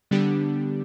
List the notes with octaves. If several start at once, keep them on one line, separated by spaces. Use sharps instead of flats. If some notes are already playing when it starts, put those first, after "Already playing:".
D3 G3 B3 D4 G4